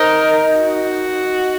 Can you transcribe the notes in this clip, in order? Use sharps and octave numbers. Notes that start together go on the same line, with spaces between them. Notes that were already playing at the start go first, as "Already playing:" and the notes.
Already playing: D#4 A#4
F#4